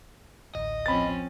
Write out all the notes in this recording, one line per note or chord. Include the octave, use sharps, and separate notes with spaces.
A1 D2 A2 D#5
F3 C4 C#4 B5 A6